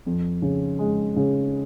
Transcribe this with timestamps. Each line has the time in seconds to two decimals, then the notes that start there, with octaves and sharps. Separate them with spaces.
0.06 F2
0.42 C#3
0.79 G#3
1.16 C#3